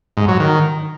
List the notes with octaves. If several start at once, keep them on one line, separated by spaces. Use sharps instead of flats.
G#2
F#3
D#3